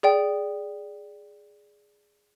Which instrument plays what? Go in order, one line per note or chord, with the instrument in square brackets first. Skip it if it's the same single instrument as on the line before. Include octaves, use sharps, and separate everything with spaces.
[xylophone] G#4 D5 G5